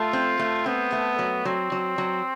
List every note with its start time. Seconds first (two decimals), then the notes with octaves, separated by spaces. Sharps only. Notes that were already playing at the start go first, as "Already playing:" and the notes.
Already playing: A3 F4
0.13 C4
0.39 A3
0.66 B3 C4
0.92 A3
1.19 F#3
1.45 F#3 C4
1.72 F#3
1.98 F#3